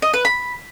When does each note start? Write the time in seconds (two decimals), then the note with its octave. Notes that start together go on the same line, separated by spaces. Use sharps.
0.02 D#5
0.14 B4
0.25 B5